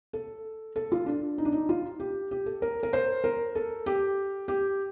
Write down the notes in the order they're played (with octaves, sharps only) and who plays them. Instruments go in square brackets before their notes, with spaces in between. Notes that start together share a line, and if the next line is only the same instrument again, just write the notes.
[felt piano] A4
A4
F4
D4
D#4
D4
D#4
F4
G4
G4
A4
A#4
A#4
C5
A#4
A4
G4
G4